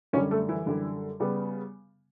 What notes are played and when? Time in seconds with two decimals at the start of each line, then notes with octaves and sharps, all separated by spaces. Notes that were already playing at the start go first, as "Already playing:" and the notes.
0.13 F#2 D3 G3 C#4 C#5
0.31 A3 A4
0.49 E3 E4
0.66 F#2 D3 G3
1.20 C#3 G3 B3